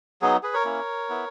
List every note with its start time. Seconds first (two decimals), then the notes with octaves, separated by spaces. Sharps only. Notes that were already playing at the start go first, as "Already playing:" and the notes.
0.22 F#3 B3 D#4 G#4
0.43 G#4 B4
0.54 A#4 C#5
0.65 A#3 C#4 E4
1.09 B3 E4